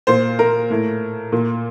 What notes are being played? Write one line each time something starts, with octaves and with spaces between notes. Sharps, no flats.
A#2 C5
A#4
A2
A#2